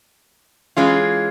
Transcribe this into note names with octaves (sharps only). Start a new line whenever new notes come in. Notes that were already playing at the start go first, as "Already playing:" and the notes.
E3 G#3 C#4 F4